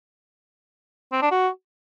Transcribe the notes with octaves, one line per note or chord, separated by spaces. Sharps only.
C4
D4
F#4